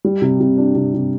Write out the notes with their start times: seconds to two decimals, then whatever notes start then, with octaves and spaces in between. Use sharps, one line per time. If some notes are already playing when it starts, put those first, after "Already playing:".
0.04 G3
0.22 C3
0.40 C3
0.58 D4
0.75 C3
0.94 C3